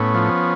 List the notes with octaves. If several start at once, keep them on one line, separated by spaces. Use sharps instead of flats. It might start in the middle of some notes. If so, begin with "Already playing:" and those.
Already playing: A2 B3 C#4
F3